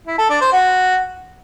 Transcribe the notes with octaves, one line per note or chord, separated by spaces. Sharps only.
E4
A4
D4
C5
F#4